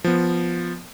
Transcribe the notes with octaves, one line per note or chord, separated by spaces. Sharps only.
F3 B3